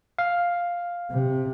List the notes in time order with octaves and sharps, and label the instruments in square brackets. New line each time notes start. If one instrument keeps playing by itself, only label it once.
[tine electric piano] F5
[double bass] C3